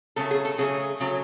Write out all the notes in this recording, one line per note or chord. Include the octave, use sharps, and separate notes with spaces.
C#3 F#3 A3 A4
G#4
A4
C#3 F#3 A3 G#4
C#3 F#3 A3